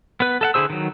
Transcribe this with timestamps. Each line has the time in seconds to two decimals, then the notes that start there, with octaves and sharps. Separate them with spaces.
0.20 B3 B4
0.41 A4 E5 F#5
0.54 D3 E4 G#4 C5 E6
0.70 D#3 F#3